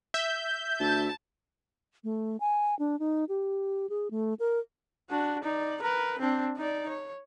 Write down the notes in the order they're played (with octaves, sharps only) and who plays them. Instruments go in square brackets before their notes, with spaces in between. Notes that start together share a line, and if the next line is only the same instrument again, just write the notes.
[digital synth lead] E5 [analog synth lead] G6
[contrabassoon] D2 [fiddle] A5
[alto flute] A3
G#5
D4
D#4
G4
G#4
A3
A#4
[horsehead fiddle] D4 F#4
D#4 D5
A#4 B4
C4 D4
D#4 D5
C#5